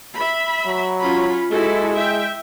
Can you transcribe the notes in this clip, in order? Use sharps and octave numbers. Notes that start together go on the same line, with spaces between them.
E5 B5
F#3
C#4 F4 B5
G#3 E4 F#4 A4
E5 G5